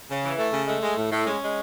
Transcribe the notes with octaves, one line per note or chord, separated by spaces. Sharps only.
C#3
E3
A3
C#3
G#3 A3
G#3
A2
A2
G#3 C#4
G#3